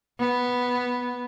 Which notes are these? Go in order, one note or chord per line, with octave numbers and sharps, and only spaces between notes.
B3